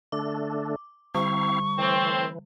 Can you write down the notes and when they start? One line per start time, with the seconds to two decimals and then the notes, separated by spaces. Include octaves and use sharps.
0.12 D3 A3 D4 D6
1.15 D3 G3 C4 E4 F5 C#6
1.79 A2 E3 C4